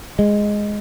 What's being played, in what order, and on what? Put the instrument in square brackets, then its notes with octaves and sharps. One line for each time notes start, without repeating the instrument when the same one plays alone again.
[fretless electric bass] G#3